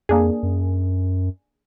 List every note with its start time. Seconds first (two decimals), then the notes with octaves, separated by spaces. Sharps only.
0.09 F2 A#3 D4 G#4
0.43 F#2